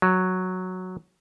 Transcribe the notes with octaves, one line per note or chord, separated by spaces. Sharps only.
F#3